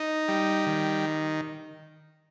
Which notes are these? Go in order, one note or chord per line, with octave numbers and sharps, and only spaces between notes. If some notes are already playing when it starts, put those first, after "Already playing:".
Already playing: D#4
G3
D#3